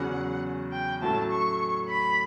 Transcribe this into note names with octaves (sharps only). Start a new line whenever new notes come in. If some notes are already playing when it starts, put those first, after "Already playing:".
Already playing: E2 C#3 F#3 C#4 F#5
G5
A2 F#3 A3 C#4 A5
C#6
B5